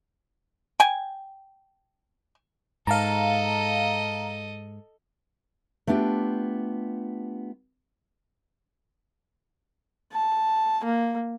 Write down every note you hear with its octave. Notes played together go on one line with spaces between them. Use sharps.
G5 G#5
G#2 A4 D#5 F5 A5 A#5
A3 B3 D4 F4 G4
A5
A#3